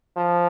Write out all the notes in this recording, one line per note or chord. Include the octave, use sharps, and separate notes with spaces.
F3